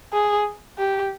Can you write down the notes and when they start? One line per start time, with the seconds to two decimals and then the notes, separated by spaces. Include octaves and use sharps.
0.13 G#4
0.78 G4